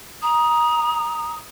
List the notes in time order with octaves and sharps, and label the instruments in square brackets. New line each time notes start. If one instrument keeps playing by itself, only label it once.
[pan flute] A#5 [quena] D#6